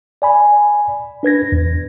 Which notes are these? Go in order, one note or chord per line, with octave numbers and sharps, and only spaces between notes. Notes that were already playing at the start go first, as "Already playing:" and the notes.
D5 G#5 B5
D4 B4 G#6 A#6
E2